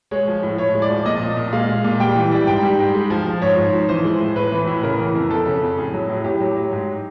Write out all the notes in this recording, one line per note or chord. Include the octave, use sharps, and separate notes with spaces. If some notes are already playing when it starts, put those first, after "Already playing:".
G#3 C#5
F3
A2
A2 C#5
G#3
D5
F3
A#2 D#5
A#2
A#2
G#3 F5
G#3
A#2
G3 G5
E3
G3
G#2 G5
G3
G#2
G#3
F3
F3
G#2 C#5
G#2
F3
E3 C5
G#3
A2
A2 B4
E3
A2
C#3 A#4
E3
F2
F2 A4
C#3
F2
A2 G#4
F#3
A2
A2 G4
F#3
F#3
G#2